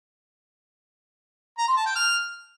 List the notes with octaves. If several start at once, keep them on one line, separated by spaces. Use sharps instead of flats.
A#5
C6
A5
G5
F6